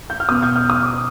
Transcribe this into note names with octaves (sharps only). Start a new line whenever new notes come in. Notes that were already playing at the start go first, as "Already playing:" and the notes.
G6
F6
B2 B3 D#6
G6
F6
D#6
D6